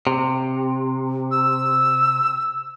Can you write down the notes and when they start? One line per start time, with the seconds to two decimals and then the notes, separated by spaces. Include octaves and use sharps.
0.07 C3
1.31 E6